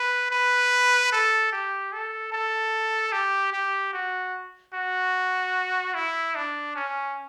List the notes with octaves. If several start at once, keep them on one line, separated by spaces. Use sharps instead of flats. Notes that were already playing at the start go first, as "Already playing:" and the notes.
Already playing: B4
B4
A4
G4
A4
A4
G4
G4
F#4
F#4
E4
D4
C#4